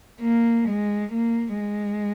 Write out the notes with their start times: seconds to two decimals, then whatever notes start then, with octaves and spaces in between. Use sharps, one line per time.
0.21 A#3
0.67 G#3
1.12 A#3
1.59 G#3